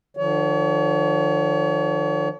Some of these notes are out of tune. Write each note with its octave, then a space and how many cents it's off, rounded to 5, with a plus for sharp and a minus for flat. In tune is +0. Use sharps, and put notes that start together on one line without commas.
D3 +45 F3 +0 C#5 +35